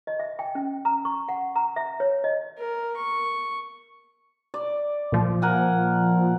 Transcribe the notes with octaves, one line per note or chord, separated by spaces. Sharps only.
D#5
E5
G5
C#4
A#5
C#6
F#5
A#5
E5
C#5
D#5
A#4
C#6
D5
A#2 F3
A#4 F#5 G#5